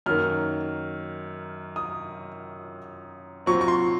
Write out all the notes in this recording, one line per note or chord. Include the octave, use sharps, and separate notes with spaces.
F#2 D#3 A#3 F6
D#6
A#2 F#3 C4 C#6
C#6
C6